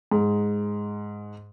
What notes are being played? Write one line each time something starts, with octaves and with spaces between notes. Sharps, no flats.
G#2